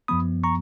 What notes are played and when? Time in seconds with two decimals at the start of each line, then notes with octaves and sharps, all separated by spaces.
0.08 F#2 F3 B3 B5 D#6
0.44 A#5 C#6